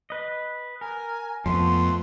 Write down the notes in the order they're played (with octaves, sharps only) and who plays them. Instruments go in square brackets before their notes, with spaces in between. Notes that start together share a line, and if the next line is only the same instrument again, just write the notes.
[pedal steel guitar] B4 D#5
[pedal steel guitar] A#4 [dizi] G#5
[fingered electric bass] F2 [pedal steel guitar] F3 A3 B3 [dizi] C6